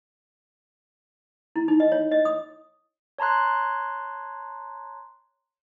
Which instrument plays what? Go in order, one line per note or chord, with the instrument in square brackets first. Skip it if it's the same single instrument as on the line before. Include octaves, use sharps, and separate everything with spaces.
[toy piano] E4
D#4
D#5
C#5
D#5
D#6
[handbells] C#5 A5 A#5 C6 F#6